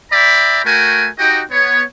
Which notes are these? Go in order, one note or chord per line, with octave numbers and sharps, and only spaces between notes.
D5 E5 G5 A#5 B5
A3 F#4 A#4 G5 G#5
D#4 F#4 G4 D#5 G5
B3 C#5